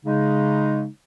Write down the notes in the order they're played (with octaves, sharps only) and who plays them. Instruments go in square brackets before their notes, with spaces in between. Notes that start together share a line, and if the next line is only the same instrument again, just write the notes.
[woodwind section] C#3 G#3 D#4